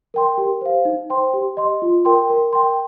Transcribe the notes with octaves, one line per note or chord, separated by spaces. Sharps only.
A#4 G5 C6
G4
C5 F5
D#4
C5 G5 C6
G4
D#5 C6
F4
A#4 G5 C6
A#4
G5 C6